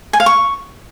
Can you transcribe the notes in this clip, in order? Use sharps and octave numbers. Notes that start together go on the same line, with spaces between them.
G#5
F5
C#6